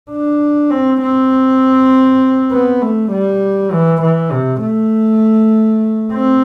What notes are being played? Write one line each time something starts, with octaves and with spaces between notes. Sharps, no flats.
D4
C4
C4
B3
A3
G3
E3
E3
C3
A3
C4